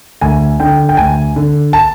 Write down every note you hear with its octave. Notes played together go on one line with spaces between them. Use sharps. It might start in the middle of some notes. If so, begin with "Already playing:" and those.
D2 G#5
D3 G5
G5
D2 G#5
D3
A5